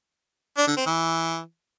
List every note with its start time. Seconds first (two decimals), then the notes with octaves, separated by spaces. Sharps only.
0.57 D4
0.67 D3
0.77 C4
0.86 E3